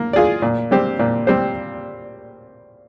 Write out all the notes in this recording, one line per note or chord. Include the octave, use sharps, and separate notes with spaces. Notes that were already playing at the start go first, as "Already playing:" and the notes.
Already playing: A#3
F4 G#4 D5
A#2
G3 C4 G4 C5
A#2
G3 C4 G4 C5